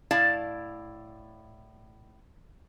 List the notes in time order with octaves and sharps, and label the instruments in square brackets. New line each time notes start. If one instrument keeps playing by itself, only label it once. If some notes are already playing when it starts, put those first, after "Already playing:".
[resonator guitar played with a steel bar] A2 E4 D5 F5 A5